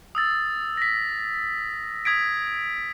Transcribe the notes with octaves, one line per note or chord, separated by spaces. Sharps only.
D#6 E6 A6
A#6 B6
D#6 G#6 B6 D7